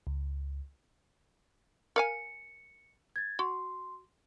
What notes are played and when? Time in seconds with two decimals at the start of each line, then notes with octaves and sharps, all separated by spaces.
0.07 C#2
1.96 A#4 F5 G#5 C#7
3.16 G#6 A6
3.39 F#4 C6